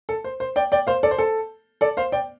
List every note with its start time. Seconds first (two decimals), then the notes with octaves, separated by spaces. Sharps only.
0.09 A4
0.24 C5
0.40 C5
0.56 D5 G5
0.72 D5 G5
0.87 C5 F5
1.03 A4 D5
1.11 C5
1.18 A4
1.81 A4 D5
1.97 C5 F5
2.12 D5 G5